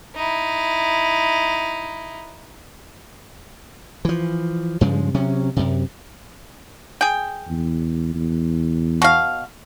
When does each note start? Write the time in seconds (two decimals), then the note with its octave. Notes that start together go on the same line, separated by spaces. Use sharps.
0.15 D#4 E4
4.05 E3 F3
4.81 G2 C#3 F3 G#3
5.14 C3 F#3 C#4
5.56 F#2 C3
7.01 G#4 G5
7.48 E2
8.15 E2
9.02 B2 F5